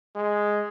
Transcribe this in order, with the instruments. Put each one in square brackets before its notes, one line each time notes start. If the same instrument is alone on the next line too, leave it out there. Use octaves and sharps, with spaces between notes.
[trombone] G#3